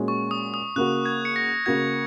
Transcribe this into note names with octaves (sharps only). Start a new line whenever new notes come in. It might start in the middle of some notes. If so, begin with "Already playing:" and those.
Already playing: A#2 G#3 C#4 F#4
C#6
D#6
D#6
C#3 A#3 F#4 F#6
G#6
C#7
A#6
C#3 A#3 F#4 G#6